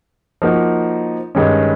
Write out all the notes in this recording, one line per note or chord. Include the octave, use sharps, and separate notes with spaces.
F3 A#3 D#4 F#4 A#4
G2 D#3 G#3 C#4